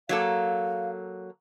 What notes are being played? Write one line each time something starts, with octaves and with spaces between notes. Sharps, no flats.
F#3 A#3 A4 F5